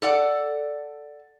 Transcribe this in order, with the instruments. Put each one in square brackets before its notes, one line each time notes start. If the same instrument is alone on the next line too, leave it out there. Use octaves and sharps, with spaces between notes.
[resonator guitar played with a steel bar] A4 D5 F#5